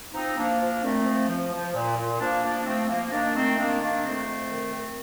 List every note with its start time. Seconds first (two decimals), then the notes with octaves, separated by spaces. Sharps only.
0.14 F3 C4 D#4
0.36 F3 A#3 D4
0.60 F3
0.82 A#2 A3 C4
1.05 F3
1.28 F3
1.52 F3
1.74 A#2
1.97 A#2
2.20 F3 A#3 D4
2.43 F3 A#3 D4
2.65 F3 A3 C4
2.89 F3 A#3
3.11 D#3 A#3 D4
3.34 D#3 A3 C4
3.58 D#3 A#3 D4
3.80 D#3 A#3 D4
4.04 F2 A3 C4
4.27 F2
4.49 D#3
4.73 D#3